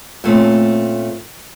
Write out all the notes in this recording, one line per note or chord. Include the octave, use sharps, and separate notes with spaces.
A#2 A3 C4 C#4